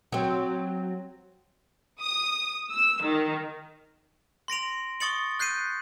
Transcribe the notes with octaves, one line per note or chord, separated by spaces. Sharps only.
F#3 C4
D#6
E6
D#3
C6 A#6 D7 F7
C#6 D#6 A6 C#7 F#7
F#6 G6 C7 C#7 D#7